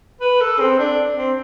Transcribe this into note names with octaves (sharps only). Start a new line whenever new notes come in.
B4
A4
C4
D4
C4